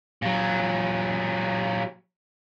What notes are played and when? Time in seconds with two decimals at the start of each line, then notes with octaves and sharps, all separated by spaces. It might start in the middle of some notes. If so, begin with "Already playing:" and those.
0.22 A#2 F#3